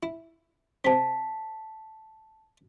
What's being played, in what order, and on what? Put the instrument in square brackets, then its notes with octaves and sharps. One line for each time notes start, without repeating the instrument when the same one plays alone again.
[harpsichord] E4
[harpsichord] C3 C4 [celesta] A5 B6